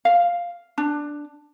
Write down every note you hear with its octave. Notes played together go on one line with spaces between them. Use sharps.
F5
D4